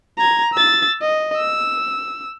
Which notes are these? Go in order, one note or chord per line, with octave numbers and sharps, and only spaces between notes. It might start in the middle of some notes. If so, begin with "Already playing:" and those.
A#5 G#6
E6 A6
D#5
E6